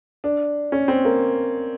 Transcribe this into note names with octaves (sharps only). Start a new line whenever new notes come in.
D4
C#4
C4
A#3